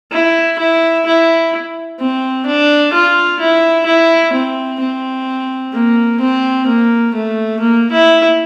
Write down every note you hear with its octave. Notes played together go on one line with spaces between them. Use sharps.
E4
E4
E4
C4
D4
F4
E4
E4
C4
C4
A#3
C4
A#3
A3
A#3
E4